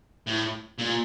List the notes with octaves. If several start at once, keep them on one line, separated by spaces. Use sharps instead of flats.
A2
A#2